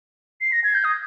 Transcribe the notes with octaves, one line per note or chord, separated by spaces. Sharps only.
C7
A#6
G#6
G6
D#6